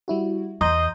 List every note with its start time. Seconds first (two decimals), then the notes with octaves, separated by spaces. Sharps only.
0.08 G3 E4 F#4
0.61 E2 D#5 A#5 C6 G6